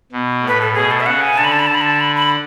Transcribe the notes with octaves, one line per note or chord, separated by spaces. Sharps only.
B2
A2
B4
A4
B2 G#4
A4
E5
C#3 F#5
G#5
D3 A5
B5
A5
B5
A5
D3 B5
A5
B5
B5